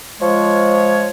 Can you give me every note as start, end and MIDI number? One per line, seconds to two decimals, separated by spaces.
0.21 1.09 53
0.21 1.09 56
0.21 1.09 73